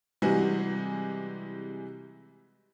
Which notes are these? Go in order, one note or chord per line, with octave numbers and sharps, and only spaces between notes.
C3 E3 G3 G#3 F#4 G#4